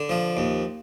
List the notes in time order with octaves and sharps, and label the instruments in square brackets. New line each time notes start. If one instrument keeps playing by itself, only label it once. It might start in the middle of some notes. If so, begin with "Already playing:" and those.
Already playing: [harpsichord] D3
F3
D#2